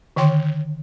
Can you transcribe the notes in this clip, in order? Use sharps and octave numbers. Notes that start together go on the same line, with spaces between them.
D3 D#3 C#5 G5 C6